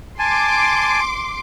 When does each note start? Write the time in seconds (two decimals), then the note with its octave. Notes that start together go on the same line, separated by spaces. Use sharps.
0.19 G#5 A5 C6 D6